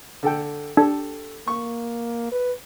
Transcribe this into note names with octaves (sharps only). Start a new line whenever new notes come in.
D3 A4 G5
D4 G4 A4
A#3 C#6
B4